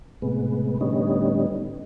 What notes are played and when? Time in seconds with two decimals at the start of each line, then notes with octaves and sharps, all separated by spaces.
0.22 A2 C3 G#3 B3
0.81 A2 D3 G3 B3 C#4 D#4